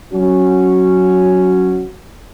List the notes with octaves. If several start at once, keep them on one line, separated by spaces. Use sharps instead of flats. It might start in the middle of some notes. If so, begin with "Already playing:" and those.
F#3 C#4 F#4